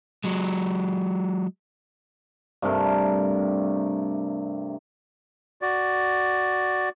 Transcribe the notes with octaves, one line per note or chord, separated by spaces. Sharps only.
F#3 G#3
G2 C3 A3 A#4
F#4 D5